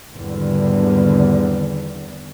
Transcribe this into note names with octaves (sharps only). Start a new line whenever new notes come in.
G#1 E2 D3 G3